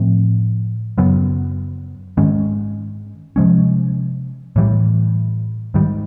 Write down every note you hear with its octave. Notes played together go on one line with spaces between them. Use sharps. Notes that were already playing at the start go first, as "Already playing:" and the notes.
Already playing: A2 F3 A3 C4
F#2 C#3 F#3 B3
G#2 D#3 G#3 C#4
C3 F3 G#3 C#4
A2 E3 G3
G#2 D#3 G3